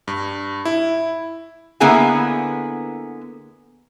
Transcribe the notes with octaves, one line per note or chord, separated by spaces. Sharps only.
G2
E4
D3 A#3 B3 E4 G#4 G#5